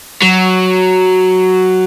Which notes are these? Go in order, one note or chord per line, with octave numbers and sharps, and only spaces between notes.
F#3